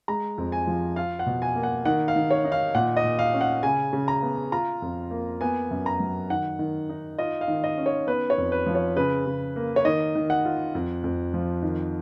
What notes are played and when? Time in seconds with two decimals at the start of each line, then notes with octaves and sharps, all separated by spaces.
0.08 G#3 A#5
0.38 F2
0.52 G#5
0.67 F3
0.96 F4 F5
1.19 F#5
1.26 B2
1.42 G#5
1.55 A#3
1.63 F#5
1.85 D#3 F#5
2.08 F5
2.16 D#3
2.31 C#5
2.44 D#4
2.52 F5
2.75 A#2 F#5
2.97 D#5
3.04 A#2
3.19 F5
3.33 C#4
3.41 F#5
3.63 C#3 G#5
3.93 C#3
4.08 A#5
4.23 B3
4.52 F4 A#5
4.82 F2
5.11 A#3
5.41 B3 G#5
5.71 F#2
5.86 A#5
6.00 F#3
6.30 D#3 F#5
6.59 D#3
6.89 D#4
7.18 F4 D#5
7.41 F5
7.48 D#3
7.64 D#5
7.77 C#4
7.86 C#5
8.07 B3 B4
8.30 C#5
8.38 F2
8.52 B4
8.66 F3
8.75 C#5
8.96 C#3 B4
9.26 C#3
9.56 A#3
9.76 C#5
9.85 D#3 D#5
10.15 D#3
10.30 F#5
10.45 F4
10.75 F2
11.04 F2
11.34 F3
11.62 D#3